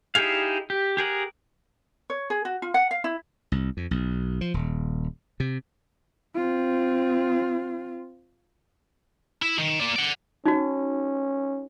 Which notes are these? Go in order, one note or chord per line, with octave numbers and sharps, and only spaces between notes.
D#4 E4 G4 G#4 F5
G4
G4 G#4 A#4 F#5
C#5
G#4
F#4
F4
F#5
F5
E4
C2
F2
B1
F3
D#1
C3
C4 F4
E4
D#3
A#3 D5
D5 F#5
C#4 D#4 F#4